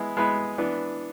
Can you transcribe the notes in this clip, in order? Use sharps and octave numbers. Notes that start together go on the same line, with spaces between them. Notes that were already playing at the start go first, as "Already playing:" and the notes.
Already playing: G#3 B3 E4 B4
G#3 B3 E4 B4
E3 B3 D4